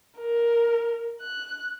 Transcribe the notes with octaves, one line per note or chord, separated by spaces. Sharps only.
A#4
F#6